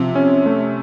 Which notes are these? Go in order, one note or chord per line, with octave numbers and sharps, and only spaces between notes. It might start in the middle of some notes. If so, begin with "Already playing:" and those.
Already playing: C3 F3
C#4
A3